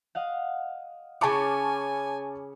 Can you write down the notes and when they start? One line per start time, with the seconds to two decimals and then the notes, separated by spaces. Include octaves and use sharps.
0.15 D#5 F5 F#5
1.21 C#3 C#4 G#5 A5 C#6 D6